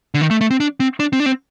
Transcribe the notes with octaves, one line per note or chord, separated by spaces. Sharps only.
D3
D#3
A3
A3
C4
D4
C4
D4
C4
D4
C4